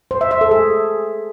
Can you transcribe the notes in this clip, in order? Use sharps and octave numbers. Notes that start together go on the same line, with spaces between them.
C5
E5
E5
A4
G#4